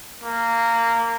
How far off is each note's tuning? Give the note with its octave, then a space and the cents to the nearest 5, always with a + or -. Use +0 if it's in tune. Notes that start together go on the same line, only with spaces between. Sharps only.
A#3 -15